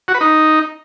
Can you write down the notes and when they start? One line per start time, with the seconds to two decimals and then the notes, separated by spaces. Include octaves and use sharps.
0.08 F#4
0.14 B4
0.21 D#4